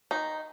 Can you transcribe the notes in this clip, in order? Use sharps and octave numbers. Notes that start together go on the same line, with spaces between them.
D#3 D#4